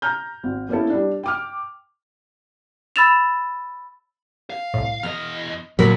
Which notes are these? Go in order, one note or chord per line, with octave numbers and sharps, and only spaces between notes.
A#5 F6 G6
G#1
A#3 B3 C#4 E4 A4
G3 D4
G5 D6 F6
B5 E6 A6 E7 F7
F5
C2 A2
E2 D#5 F6
A#2 D3 F#3 G#3 A#4 B5